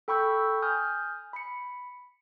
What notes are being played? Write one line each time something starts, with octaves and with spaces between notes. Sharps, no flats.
A4 G5 B5 C#6 E6 G6
G#5 D#6 F6 G6
B5 C#7